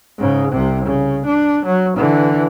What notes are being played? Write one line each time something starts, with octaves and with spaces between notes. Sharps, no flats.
G#2 C#3
C2 C3
C#3
D4
F#3
D3 E3